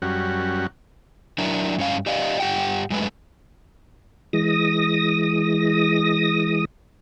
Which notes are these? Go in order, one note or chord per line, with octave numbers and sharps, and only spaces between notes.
F#2 G3 C#4 F#4
F#3 D4 E4 A#4
G2 C#4 F5
G4 D5 D#5 F5
G2 G4 F#5 G5
F#2 G#3 A3 B4
E3 G#3 D#6 A#6